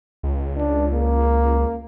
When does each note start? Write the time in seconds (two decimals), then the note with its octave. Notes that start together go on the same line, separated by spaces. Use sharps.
0.23 C#2
0.57 D4
0.92 A#3